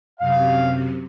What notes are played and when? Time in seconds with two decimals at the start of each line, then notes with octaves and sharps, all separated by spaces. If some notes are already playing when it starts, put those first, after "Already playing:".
0.20 F#2 C3 F5